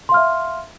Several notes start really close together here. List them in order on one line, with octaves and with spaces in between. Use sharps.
C6 F5 F6 E5